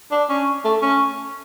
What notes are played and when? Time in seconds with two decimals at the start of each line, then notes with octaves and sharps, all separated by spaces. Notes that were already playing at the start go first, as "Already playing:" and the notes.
0.12 D4
0.30 C#4
0.65 A3
0.82 C#4